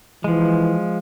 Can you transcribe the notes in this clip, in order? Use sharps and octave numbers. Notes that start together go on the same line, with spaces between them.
E3 F3 G#3